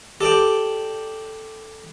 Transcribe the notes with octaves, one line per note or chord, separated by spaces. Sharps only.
G4 A4 D5 G5